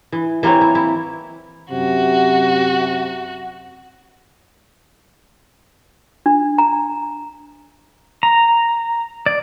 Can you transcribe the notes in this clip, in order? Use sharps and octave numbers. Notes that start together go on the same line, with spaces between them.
E3
E3 A#3 C4 C#5
E4
E4
F#2 C3 F#4
D4
A#5
A#5
D5